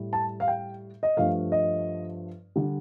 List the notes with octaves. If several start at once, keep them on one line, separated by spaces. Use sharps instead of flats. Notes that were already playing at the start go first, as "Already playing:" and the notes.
Already playing: A2 G3
A5
F5
G5
D#5
G2 F3 A3 F5
D#5
D3 G3